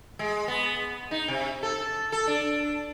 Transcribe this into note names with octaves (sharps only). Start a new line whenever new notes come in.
G#3
B3
D#4
C3
A4
A4
D4